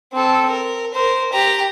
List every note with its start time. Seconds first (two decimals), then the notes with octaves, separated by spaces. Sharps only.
0.13 C4 A4
0.50 A#4
0.94 A#4 C5
1.32 G4 A#5